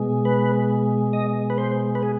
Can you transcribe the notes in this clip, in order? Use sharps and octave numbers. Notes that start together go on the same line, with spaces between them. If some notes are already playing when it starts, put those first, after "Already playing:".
Already playing: B2 G#3
B4
D#5
B4
C5
B4
G#4